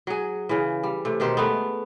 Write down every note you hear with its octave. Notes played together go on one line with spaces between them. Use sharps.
F#3 G#4
C#3 E3
G3
C3 A3
B2 D#3 G4 C5
G#3 A3 B3